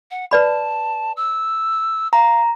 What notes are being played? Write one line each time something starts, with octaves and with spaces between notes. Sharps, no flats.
F#5
B4 D5 A5 B5
E6
F5 A#5